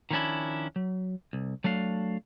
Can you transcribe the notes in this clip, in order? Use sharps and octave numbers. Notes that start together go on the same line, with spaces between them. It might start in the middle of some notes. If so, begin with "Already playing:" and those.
D#3 F3 B3 C#4 D4 E4
F#3
C2
F#3 A3 D4 F5